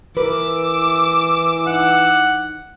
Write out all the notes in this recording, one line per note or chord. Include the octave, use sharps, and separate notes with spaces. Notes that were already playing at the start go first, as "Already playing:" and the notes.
E3 A#4 B4 D6 E6
D#4 F#5